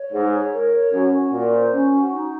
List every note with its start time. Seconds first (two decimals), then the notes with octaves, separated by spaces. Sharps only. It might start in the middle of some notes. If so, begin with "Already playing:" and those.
Already playing: C#5
0.12 G#2 G#4
0.32 C#5
0.53 A#4
0.72 C#5
0.92 F#2 C#4
1.11 F#4
1.31 A#2 F4
1.51 C5
1.72 C#4
1.91 F#4
2.11 D#4